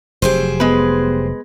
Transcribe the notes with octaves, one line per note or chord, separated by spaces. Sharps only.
F1 F#3 G4 G#4 C5
G#3 B3 B4